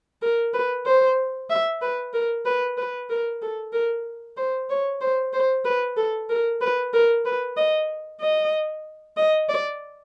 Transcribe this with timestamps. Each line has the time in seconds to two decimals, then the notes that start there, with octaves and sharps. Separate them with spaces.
0.22 A#4
0.53 B4
0.85 C5
1.50 E5
1.81 B4
2.13 A#4
2.45 B4
2.77 B4
3.09 A#4
3.41 A4
3.73 A#4
4.37 C5
4.69 C#5
5.01 C5
5.33 C5
5.65 B4
5.97 A4
6.29 A#4
6.61 B4
6.93 A#4
7.25 B4
7.57 D#5
8.21 D#5
9.17 D#5
9.49 D5